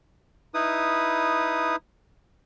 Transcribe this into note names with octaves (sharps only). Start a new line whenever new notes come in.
D#4 E4 B4 D#6